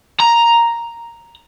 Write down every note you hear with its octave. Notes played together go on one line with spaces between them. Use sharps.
A#5